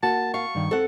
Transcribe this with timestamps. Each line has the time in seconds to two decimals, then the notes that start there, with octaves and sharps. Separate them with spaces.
0.03 A#3 F#4 A5
0.34 F5 C#6
0.55 G2 D#3
0.71 C4 A4 F#5